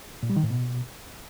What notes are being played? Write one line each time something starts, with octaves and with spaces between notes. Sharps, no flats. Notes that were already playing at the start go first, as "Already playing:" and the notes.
A#2
G3
D#3
A2
B2